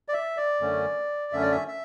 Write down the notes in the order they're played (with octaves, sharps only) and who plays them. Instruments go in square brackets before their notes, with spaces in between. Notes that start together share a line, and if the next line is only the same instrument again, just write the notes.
[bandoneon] D5
E5
D5
F#2 D3 A3 C#4
F#2 D3 A3 C#4 E5
D5
E5
E5